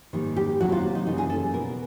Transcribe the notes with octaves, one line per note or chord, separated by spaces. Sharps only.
G#2 D#3 G3 A#3
G4
C3 D#3 F#3 A#3 F#4
F4
D#4
F#2 C#3 E3 G3 A#3 D#4
G#4
A4
B2 G3 B3 A#4